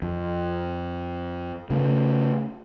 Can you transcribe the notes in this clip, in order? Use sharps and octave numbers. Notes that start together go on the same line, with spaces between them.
F2
C#3 A3